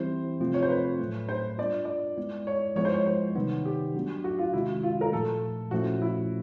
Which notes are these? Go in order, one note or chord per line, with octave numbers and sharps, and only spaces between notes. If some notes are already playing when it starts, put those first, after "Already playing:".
Already playing: E3 G3 C4 E4 G4 C5
C3 F3 A3 C4 F4
C#5
C5
B4
A2 F#3 A3
C5
G3 B3 D4 F4 D5
D5
G#3 B3 E4
C#5
F3 G#3 B3 E4 C#5
C5
C#5
C5
C3 D#3 G3 B3 D#4
G4
F#3 A3 D4 F#4
F#4
F4
C3 D#3 G#3 C#4 E4 F#4
F4
A#4
A#2 F3 A3 A4
A#2 F3 A3 C#4 E4 F#4
E4